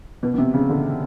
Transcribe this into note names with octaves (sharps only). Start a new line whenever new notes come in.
B2
B2
C3
C#3
D3